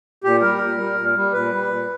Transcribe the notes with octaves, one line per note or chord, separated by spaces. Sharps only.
A#2 G4
G3 A#4
A#2
G3
A#2
G3
A#2 B4
G3
A#2